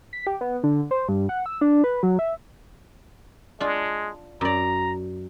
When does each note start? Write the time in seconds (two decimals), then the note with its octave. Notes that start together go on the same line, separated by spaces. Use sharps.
0.13 B6
0.27 G4
0.41 B3
0.63 D3
0.91 C5
1.08 G2
1.29 F#5
1.46 E6
1.61 D4
1.84 B4
2.03 F#3
2.19 E5
3.60 G#3 D4 F4
4.41 F#2 D5 A#5